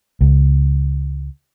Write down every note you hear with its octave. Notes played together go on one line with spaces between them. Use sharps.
C#2